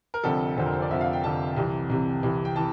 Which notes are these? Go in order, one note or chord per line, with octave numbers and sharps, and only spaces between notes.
A#4
F1 F2 D3 F3 A4
F1 F2 D3 F3 C5
A#4
C5
D5
F1 F2 D3 F3 E5
F5
G5
F1 F2 D3 F3 A5
C2 C3 E3
C2 C3 E3
C2 C3 E3
G5
E3 A5